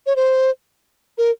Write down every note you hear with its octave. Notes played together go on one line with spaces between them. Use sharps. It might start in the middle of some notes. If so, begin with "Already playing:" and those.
C#5
C5
A#4